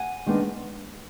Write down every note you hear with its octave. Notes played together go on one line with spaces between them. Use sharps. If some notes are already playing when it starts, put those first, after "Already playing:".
Already playing: F#5 G#5
D#3 G#3 B3 D4